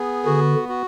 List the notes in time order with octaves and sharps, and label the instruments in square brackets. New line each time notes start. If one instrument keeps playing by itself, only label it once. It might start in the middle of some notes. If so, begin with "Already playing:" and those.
Already playing: [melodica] B3 G#4
[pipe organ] D3 [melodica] F#4
[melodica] F#4